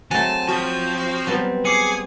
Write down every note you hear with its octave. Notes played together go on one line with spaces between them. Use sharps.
F#3 A3 C4 G#5 A5
F3 F#4
F#3 G3 B3
G#4 D6 C7 C#7